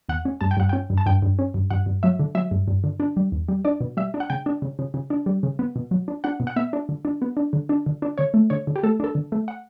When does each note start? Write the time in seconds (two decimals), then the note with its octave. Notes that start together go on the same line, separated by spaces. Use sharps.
0.09 E2 F#5
0.25 C#4
0.41 G2 A5
0.51 G5
0.57 G2 F#5
0.69 C#4 G5
0.90 G2
0.98 A5
1.06 G2 G5
1.22 G2
1.39 C#4
1.54 G2
1.70 G2 F#5
1.86 G2
2.03 F#3 E5
2.19 D3
2.35 F#3 E5
2.51 G2
2.68 G2
2.84 D3
3.00 D4
3.17 G3
3.32 E2
3.49 G3
3.65 D4 D5
3.81 B2
3.97 G3 E5
4.14 D4
4.20 F#5
4.30 C#3 G5
4.46 D4
4.62 C#3
4.79 C#3
4.94 C#3
5.10 D4
5.26 G3
5.43 C#3
5.59 B3
5.76 B2
5.91 F#3
6.08 D4
6.24 D4 F#5
6.40 B2
6.47 F#5
6.56 B3 E5
6.73 D4
6.89 D3
7.05 D4
7.22 B3
7.37 D4
7.53 D3
7.69 D4
7.86 D3
8.02 D4
8.18 D3 C#5
8.34 A3
8.50 D3 C#5
8.67 D3
8.76 G4
8.83 A3 A4
9.00 D4 A4
9.15 D3
9.32 A3
9.48 F#5